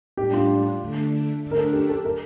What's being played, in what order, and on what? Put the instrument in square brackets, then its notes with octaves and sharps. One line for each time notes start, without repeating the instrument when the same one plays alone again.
[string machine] A2 G3 D4 [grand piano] G4
[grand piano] F4
[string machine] D3 A3 D4
D3 A3 D4
[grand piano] A#4
A4
G4
A4
A#4